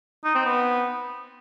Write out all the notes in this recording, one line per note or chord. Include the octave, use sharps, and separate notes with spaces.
D#4
C4
B3